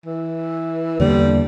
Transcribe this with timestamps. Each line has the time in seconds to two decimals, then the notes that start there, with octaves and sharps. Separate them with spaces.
0.06 E3
1.00 E2 D3 G3 A#3